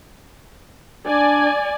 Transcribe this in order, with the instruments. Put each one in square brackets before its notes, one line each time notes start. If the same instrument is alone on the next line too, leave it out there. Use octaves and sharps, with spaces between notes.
[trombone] D4 [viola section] D5 G#5